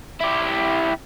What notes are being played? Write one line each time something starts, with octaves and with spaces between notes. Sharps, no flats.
E4 G4